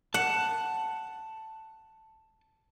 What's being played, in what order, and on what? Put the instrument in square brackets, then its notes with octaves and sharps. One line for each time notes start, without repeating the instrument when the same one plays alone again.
[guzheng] F#5 [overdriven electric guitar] A5